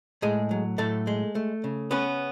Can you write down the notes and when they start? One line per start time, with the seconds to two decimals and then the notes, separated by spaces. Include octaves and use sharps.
0.22 A2 G#3 G#4
0.51 F#3
0.78 A2 A3 A4
1.07 G#3
1.35 A3
1.64 C#3
1.91 B3 C#4 B4